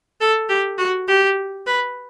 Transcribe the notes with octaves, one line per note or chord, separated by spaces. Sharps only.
A4
G4
F#4
G4
B4